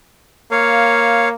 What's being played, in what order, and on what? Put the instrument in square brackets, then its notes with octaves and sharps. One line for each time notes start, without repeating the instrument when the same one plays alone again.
[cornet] A#3 [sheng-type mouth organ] C#5 F5